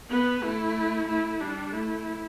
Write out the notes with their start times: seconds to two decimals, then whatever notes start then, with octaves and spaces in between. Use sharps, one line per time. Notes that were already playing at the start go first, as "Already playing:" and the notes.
0.10 B3 B4
0.43 A3 E4
1.08 A3 E4
1.41 G3 D4
1.73 A3 E4